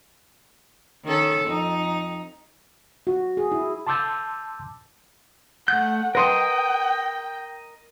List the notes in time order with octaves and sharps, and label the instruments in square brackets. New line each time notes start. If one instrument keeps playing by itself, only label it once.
[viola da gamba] D#3 C#4 A4
F2 D#4
[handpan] F#4
G#4
E4
[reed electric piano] A5 C6 D6 E6 G6 A6
[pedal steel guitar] A3 G6 [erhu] F#5
[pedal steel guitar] A#4 D#5 [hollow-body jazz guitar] B4 F#5 C6 [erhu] G5